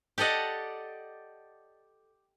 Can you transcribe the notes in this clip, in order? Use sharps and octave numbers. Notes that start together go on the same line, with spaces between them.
G4 A4 D5 D#5 F#5